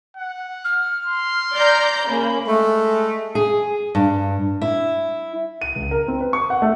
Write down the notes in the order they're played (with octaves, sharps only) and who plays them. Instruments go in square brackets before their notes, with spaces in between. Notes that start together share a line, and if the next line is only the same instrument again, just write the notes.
[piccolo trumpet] F#5
[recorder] F6
[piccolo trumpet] C6
[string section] D5 A#5 G6
[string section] C#3 A#3 [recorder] B5
[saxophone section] G#3 A3
[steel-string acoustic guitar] G#4
G2
E4
[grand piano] D#7
C#2
A#4
C4
B4
C#6
F#5
A3